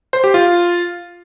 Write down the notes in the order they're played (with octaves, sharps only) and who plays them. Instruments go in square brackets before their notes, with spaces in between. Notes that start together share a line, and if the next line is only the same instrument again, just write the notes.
[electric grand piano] C5
G4
F4